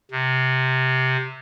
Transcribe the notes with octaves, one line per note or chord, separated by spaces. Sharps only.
C3